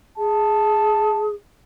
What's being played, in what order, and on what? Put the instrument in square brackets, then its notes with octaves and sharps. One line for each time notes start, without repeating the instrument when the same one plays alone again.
[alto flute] G#4 [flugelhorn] A5